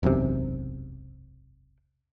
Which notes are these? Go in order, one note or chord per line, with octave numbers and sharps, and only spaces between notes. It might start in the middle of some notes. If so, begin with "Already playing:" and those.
E1 B1 F#2 C3